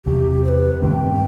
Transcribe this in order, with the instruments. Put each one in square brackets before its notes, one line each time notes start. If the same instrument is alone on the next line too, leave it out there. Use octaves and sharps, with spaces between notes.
[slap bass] E2 C3 F#3 [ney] G4
[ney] C5
B4
[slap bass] G2 D#3 A3 C4 [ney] G5